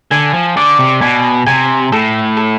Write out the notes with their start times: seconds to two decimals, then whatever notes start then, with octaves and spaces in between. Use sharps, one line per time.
0.11 D3 G#5
0.34 F3
0.56 D3 D5
0.79 C3
1.01 B2 G#5
1.46 C3 G#5
1.92 A2 A4
2.37 A4